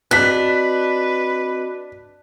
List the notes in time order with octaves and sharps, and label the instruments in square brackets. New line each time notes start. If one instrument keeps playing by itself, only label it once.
[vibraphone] C4 F#4 D#5 [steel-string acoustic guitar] D4 [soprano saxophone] B4 [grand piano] F#6 B6